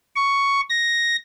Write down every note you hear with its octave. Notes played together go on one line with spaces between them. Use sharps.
C#6
A#6